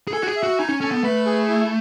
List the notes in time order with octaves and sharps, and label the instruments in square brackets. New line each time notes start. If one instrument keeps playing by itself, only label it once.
[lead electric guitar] G#4
[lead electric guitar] A4 [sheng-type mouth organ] G#5
[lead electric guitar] F#4
G#4
[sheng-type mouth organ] E5
[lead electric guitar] F#4
[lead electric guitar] D#4 [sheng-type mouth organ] G#5
[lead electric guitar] C#4
[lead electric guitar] C#4 [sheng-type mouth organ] A4
[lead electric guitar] B3
[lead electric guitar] A3 [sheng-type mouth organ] B4
[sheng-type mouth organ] G#4
E4